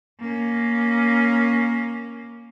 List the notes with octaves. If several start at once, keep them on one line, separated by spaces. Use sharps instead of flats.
A#3 C#4